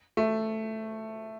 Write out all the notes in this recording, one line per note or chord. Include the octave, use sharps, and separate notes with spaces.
A3